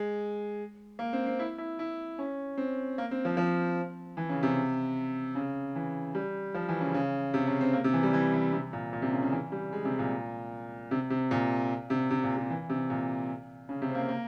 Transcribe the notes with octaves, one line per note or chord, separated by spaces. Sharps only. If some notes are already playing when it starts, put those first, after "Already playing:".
Already playing: G#3
A#3
C4
C4
E4
E4
E4
C#4
C4
A#3
C4
F3
F3
E3
C#3
C3
C#3
E3
G3
F3
E3
C#3
C#3
C3
C#3
C4
A#3
C3
E3
G3
E3
E3
C3
A#2
A#2
C3
C#3
C#3
E3
G3
G#3
C3
A#2
C3
C3
A#2
C3
C3
A#2
C3
E3
C3
A#2
C#3
C3
C4
A#3
A#3